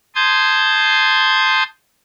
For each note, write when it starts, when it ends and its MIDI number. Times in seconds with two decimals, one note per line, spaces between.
0.15 1.63 81
0.15 1.63 84
0.15 1.63 87
0.15 1.63 91
0.15 1.63 92